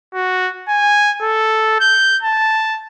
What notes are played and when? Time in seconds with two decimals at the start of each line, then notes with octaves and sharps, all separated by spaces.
0.14 F#4
0.68 G#5
1.22 A4
1.80 G6
2.23 A5